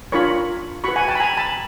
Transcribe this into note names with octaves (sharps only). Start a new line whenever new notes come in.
D4 F4 A#4 C#5 B5 C#6
F#4 B4 B5 C#6
F#5 G#5
G5 A5
B5
G#5 A#5
A5 B5